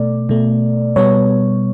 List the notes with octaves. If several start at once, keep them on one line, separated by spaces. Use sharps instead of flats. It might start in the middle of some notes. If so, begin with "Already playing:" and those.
Already playing: B2 A3 D5
B2 A3
B2 G3 B3 C#5